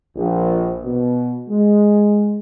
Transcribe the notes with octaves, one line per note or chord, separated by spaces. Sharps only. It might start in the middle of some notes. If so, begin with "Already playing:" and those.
A#1
B2
G#3